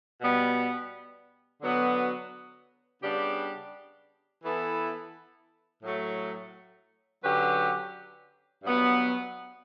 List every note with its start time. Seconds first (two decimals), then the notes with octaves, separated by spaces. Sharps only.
0.21 B2 G3 B3
1.62 D3 F#3 B3 F#4 B4
3.02 C#3 G3 B3 D4 G4
4.43 E3 B3 E4 A4
5.83 A2 F#3 A3
7.24 D3 F#3 C#4 G4 B4
8.64 G2 F#3 B3